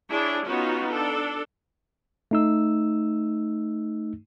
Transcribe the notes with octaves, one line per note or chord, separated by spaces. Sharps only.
D4 E4 G#4 C#5
B3 C#4 D#4 F4 F#4
D4 A4
A3 D#4 E6